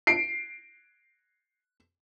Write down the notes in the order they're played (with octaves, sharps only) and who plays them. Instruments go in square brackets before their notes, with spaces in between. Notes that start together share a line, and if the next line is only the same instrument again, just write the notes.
[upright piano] C7 D7